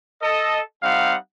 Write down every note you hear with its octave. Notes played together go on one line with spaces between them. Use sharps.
A4 D#5
G3 C4 D#4 F5 F#5